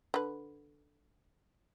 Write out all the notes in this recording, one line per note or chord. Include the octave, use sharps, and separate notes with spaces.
D3 B4